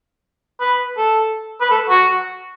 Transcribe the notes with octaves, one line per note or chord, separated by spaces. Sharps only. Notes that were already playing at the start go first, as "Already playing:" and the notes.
B4
A4
B4
A4
F#4